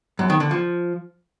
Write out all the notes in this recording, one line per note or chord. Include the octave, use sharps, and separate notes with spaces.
F#2
D#3
D3
F3